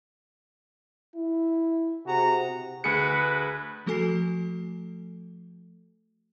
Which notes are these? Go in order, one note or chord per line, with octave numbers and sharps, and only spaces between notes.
E4
C3 F#4 G#4 A#5
D2 G#4 B4 C#7
F3 A3 F#4 A4 G#5 C7